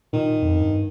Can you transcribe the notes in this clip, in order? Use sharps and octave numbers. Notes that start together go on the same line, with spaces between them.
A#2 D#3
F2
G2